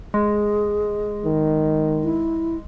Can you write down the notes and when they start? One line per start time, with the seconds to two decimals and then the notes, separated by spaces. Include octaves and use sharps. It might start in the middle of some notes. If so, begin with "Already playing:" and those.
0.14 G#3 G#4
1.25 D#3
2.03 E4